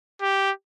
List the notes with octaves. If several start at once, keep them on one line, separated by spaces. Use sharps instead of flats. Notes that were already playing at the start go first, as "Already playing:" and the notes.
G4